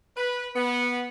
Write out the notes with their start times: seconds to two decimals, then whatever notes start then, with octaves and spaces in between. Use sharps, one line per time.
0.17 B4
0.56 B3